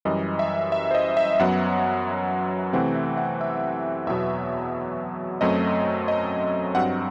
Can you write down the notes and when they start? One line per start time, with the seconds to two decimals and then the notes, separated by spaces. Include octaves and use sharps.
0.05 F#2 E3 G3 D#5
0.39 E5
0.72 E5
0.91 C5
0.95 D#5
1.17 E5
1.39 F#2 F#3 B3 F#5
2.73 C3 E3 A3 C4 F#5
2.95 E5
3.17 F#5
3.41 E5
4.07 E2 B2 F#3 B3 E5
5.41 F#2 F#3 A3 C4 D#5
6.08 D#5
6.75 G2 F#3 C4 F#5